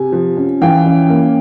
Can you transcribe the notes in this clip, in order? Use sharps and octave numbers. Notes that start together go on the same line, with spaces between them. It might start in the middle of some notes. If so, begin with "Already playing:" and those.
Already playing: C3 G#5
F3
C#4
E3 F5 G5
C#4
A#3